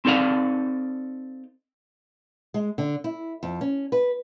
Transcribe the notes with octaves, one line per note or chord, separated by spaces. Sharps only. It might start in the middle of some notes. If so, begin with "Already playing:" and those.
C4 D#4 A4 D5 F5
G#3
D3
E4
F2
C#4
B4